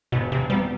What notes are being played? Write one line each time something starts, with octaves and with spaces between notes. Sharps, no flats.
E1 B2
C3
E2 C3 F#3 G3 B3